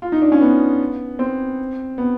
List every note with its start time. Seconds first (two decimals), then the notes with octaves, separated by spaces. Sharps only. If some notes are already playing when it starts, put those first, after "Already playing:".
0.02 F4
0.12 D#4
0.22 D4
0.32 C#4
0.41 B3
1.19 C4
1.98 B3